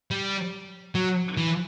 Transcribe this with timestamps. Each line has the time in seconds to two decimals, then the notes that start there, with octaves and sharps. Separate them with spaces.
0.11 G3
0.95 F#3
1.37 E3